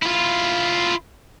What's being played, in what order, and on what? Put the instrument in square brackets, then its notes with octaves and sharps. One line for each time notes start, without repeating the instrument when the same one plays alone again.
[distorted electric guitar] E4 F4